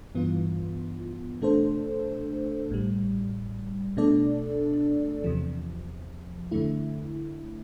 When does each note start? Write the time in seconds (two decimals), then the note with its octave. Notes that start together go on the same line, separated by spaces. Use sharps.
0.15 G2 E3 B3 F4
1.42 B2 A3 D4 A4 C5
2.69 A1 A2 G3
3.97 B2 A3 D4 A4 D5
5.24 E2 C3 F3
6.51 F2 D3 A3 E4